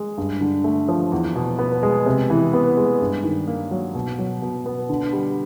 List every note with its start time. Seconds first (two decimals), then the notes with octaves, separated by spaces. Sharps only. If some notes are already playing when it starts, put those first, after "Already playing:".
Already playing: G#3
0.17 G2
0.41 D3
0.64 A3
0.89 F3
1.12 E2
1.35 B2
1.59 B3
1.83 G#3
2.06 C3
2.30 E3
2.53 B3
2.77 G#3
3.01 G2
3.24 D#3
3.47 A#3
3.71 F#3
3.95 B2
4.18 F#3
4.42 B2
4.66 B3
4.89 D3
5.13 G3